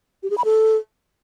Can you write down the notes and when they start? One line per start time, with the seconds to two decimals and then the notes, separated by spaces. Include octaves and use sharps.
0.23 G4
0.30 G#4
0.38 B5
0.45 A4